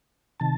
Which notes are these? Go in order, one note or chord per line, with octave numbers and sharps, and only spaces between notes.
C3 D#3 A5